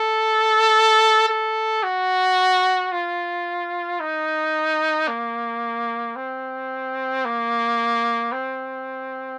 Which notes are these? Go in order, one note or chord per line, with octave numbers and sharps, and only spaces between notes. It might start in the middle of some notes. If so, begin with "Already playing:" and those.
Already playing: A4
A4
F#4
F4
D#4
A#3
C4
A#3
C4